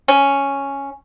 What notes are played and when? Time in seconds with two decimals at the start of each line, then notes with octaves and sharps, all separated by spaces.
0.08 C#4